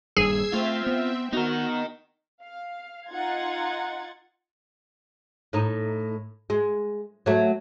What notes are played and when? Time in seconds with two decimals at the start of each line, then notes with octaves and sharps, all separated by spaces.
0.17 D#1 G2 G#4 E6 G#6 C7
0.53 A3 C4 F4 E5
0.87 B3
1.33 B3 D#4 F#4 A#4
2.44 F5
3.09 D#4 F4 F#5 G#6 A6
5.53 A2 D#4
6.50 G#3
7.26 F#3 A3